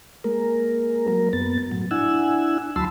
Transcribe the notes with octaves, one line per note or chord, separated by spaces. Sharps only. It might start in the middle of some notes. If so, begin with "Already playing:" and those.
G#3 A#3 A#4
F#3 A#3 A#4
F#2 B3 A6
A2 F#3
D4 E4 F#5 G#5 E6
D2 F#3 A5 B5 C6 E6